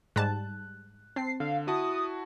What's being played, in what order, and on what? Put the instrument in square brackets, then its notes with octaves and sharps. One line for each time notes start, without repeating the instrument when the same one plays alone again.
[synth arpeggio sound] G#2 G3 A5 [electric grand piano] F#6
[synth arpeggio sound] C4 [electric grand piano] A5 [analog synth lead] C7
[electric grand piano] D3 [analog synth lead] F5
[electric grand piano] E4 F#4 A5 [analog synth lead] D#6